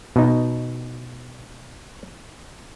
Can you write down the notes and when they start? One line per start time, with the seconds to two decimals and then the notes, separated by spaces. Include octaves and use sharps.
0.16 B2 D#4